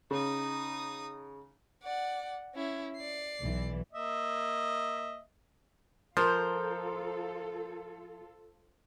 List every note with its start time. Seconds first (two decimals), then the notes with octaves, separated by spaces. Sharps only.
0.11 C#3 D#4 D#6
1.83 D5 F#5
2.55 C#4 E4
2.97 D5 C7
3.40 B1 E3
3.93 A#3 D#5 E5
6.17 F3 F4 A4 A#4 C5